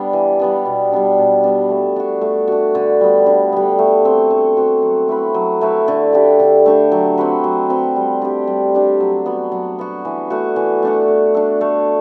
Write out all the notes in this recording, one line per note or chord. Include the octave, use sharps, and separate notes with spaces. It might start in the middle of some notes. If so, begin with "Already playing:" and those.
Already playing: G3 B3 D4
E3
G3 B3 D4
B2
G3 B3 D4
B2
G3 B3 D4
A3
D4 F#4
A3
D4 F#4
D3
G3 B3
D3
G3 B3
A3
C4 F#4
A3
C4 F#4
F#3
A3 E4 B4
F#3
A3 E4 B4
D3
A3 D4 G4
D3
A3 D4 G4
F#3
C4 F#4 B4
F#3
C4 F#4 B4
G3
D4 G4
G3
D4 G4
F#3
B3 F#4
F#3
B3 F#4
E3
A3 D4 F#4
E3
A3 D4 F#4
A3
D4 F#4 A4
A3